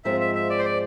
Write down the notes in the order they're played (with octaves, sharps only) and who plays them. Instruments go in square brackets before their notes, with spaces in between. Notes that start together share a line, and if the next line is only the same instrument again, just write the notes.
[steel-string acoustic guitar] G#2 F3 G#3 C4 F4 [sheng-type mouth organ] E5
[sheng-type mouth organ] E5
E5
D5
C5
D5